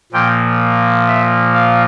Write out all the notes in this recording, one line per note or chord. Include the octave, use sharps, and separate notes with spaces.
A#2 F3 A#3 G5
E5
F5